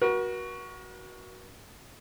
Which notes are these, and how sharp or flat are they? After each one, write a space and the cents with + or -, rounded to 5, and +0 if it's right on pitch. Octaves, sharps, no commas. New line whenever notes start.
F#4 +5 A#4 +45